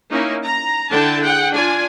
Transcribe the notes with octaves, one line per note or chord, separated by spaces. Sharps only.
A#3 C#4 D#4 E4
A#5
D3 D4 E4 A4 G5 A5
G#4 F#5 G5
D4 F4 D5 G#5